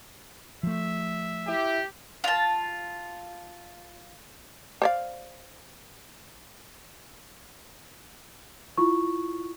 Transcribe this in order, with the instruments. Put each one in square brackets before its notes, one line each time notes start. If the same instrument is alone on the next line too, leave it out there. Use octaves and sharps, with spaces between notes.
[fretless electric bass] F3 A3 [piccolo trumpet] E5
[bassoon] E4 [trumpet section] G4
[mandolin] F4 A5
[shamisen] C5 D5 F5
[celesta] E4 F4 C#6